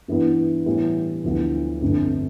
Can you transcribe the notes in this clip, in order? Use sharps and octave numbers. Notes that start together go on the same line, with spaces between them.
G2 E3 B3 E4
A2 E3 G3 B3
D2 D3 F3 B3 E4
G1 F2 D3 A3